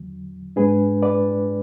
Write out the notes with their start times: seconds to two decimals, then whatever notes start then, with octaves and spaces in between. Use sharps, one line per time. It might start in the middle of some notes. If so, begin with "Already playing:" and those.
Already playing: E2 D3 F#3
0.56 G#2 G#3 D4 G#4 B4
1.03 B4 D5